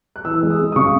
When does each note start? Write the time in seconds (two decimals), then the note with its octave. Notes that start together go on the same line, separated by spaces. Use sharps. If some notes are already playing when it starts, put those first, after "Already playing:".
0.16 F#6
0.25 E3 E6
0.43 G#3
0.50 D#6
0.60 G#3
0.72 D#6
0.76 C#3 C#6